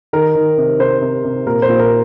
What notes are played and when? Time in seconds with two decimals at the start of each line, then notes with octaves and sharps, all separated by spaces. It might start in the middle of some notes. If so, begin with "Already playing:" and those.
0.13 D#3 A#4
0.35 D#3
0.57 C3
0.79 C3 C5
1.01 C3
1.25 C3
1.46 A#2 A#4
1.62 C5
1.69 A#2
1.79 A#4